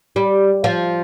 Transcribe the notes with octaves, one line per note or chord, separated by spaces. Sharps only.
G3
F3